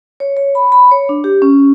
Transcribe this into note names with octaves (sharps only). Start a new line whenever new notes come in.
C#5
C#5
B5
B5
C#5
D4
G4
C#4